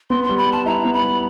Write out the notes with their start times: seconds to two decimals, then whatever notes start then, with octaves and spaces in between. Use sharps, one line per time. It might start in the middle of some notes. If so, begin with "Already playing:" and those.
0.10 B3 C6
0.24 G3 C6
0.38 B5
0.47 G3
0.52 A5
0.66 E4 A#5
0.85 B3
0.94 B5
1.03 G3